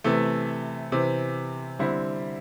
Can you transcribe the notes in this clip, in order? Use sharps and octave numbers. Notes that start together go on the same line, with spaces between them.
C3 E3 A3
C3 E3 C4
D3 G3 C4 E4